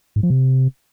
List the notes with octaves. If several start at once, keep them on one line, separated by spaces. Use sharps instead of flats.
G#2
F3
C3